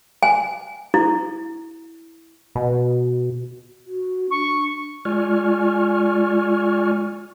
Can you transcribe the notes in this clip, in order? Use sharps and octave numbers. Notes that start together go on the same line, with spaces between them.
G#5
E4
B2
F#4
D4 C#6
G#3 F4 D5 G#5 C#6 F6